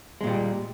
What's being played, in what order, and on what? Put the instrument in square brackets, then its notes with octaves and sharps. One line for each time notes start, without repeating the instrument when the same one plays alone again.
[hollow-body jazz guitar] G#3
A#2
G3